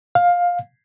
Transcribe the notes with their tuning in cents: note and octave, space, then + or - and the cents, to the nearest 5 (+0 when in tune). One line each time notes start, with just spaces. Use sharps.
F5 +15